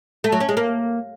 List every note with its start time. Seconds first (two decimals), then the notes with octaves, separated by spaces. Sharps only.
0.24 A3
0.32 F#3
0.40 C#4
0.49 G#3
0.57 A#3